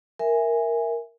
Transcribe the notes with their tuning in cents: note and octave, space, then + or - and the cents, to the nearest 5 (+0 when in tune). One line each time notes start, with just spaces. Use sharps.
A#4 +0 E5 +0 G#5 -10